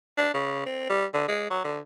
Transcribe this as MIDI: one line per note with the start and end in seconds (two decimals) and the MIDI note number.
0.18 0.32 62
0.34 0.63 49
0.66 0.86 60
0.89 1.05 55
1.14 1.24 50
1.28 1.46 56
1.50 1.64 54
1.64 1.79 50